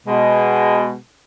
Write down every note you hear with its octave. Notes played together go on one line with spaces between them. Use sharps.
B2 G#3